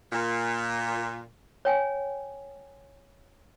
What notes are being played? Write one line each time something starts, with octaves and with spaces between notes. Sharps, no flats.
A#2
C#5 G5 G#5